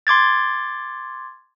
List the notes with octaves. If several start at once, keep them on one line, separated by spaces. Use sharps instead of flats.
C6 D6 G#6 A6